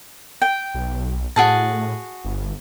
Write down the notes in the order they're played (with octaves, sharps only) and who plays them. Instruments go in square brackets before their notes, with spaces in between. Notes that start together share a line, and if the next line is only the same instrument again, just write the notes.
[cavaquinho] G5
[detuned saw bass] B1
[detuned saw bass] A2 [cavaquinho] F#4 G#4 A5
[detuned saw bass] G1